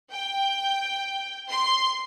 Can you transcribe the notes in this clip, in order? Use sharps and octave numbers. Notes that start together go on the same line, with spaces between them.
G5
C6